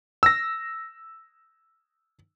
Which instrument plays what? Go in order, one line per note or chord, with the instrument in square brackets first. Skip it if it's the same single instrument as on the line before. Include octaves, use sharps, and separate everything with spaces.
[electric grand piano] E6 A#6